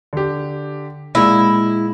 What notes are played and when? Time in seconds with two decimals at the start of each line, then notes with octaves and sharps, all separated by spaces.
0.13 D3 G4
1.15 A#2 G#3 E4 A#6